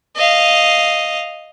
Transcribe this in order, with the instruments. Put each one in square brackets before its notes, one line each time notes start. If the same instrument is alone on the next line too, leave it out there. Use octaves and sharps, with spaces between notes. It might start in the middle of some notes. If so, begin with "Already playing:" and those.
[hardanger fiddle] D#5 F5